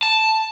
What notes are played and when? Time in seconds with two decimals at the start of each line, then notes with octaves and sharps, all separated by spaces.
0.03 A5